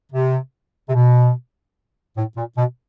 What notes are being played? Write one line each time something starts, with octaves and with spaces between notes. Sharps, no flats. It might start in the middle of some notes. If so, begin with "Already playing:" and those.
C3
C3
B2
A2
A#2
B2